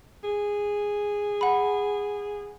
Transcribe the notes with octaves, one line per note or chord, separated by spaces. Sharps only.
G#4
F#5 B5